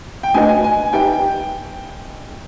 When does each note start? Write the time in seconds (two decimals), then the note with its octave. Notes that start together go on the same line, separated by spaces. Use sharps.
0.23 G5
0.34 A3 D4 F#4 B4 D#5 G#5
0.49 G#5
0.64 G#5
0.93 D#4 G4 B4 E5 G5
1.12 G5